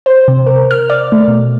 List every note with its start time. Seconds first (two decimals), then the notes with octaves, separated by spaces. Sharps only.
0.06 C5
0.28 C3
0.46 A#4
0.71 F6
0.90 D5
1.12 A3
1.28 B2